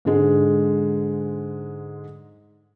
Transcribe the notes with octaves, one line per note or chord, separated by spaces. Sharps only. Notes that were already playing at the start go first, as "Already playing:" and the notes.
G#2 D3 G#3